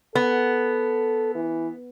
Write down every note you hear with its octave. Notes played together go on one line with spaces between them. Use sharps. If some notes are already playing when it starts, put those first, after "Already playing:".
B3 A4
E3